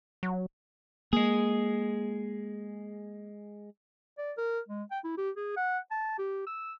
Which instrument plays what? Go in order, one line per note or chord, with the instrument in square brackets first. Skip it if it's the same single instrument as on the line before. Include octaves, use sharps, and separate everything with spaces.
[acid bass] F#3
[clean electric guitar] G#3 G#4 [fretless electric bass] A#3
[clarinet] D5
A#4
G#3
G5
E4
G4
G#4
F#5
A5
G4
E6